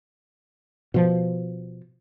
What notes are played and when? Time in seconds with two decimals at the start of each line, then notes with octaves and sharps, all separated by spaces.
0.94 B2 F3